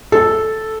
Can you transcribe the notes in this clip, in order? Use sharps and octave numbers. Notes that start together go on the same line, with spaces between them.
A4